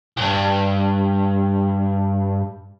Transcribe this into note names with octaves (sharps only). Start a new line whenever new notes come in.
C2 G2